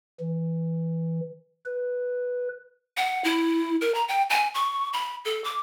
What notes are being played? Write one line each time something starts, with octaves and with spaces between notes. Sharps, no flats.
E3
B4
F#5
E4
A#4
A#5
G5
G#5
C#6
B5
A4
D6